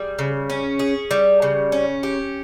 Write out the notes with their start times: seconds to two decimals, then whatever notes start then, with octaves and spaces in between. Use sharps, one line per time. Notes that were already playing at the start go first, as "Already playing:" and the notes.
Already playing: G3 G#4
0.19 C#3
0.50 C#4
0.79 G#4
1.11 G3
1.42 C#3
1.72 C#4
2.03 G4